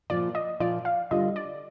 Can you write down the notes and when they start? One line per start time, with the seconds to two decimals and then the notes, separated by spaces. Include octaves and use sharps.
0.10 A#2 F3 A#3 F4 D5
0.35 D#5
0.60 A#2 F3 A#3 F4 D5
0.85 F5
1.11 D3 G3 D4 F4 D#5
1.36 D5